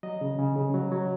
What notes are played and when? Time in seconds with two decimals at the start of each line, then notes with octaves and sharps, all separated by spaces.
0.03 F#3 D#5
0.21 C#3
0.39 C#3
0.56 C#3
0.74 F#3
0.92 F#3